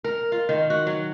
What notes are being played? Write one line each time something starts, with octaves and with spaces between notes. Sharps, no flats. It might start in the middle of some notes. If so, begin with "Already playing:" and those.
A#4
F4
D#3
F#4
F#3